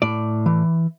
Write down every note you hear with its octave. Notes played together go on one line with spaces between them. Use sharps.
A2 D5
E3